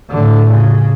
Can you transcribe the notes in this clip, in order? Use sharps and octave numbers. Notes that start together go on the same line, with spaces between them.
A2 D3
C#3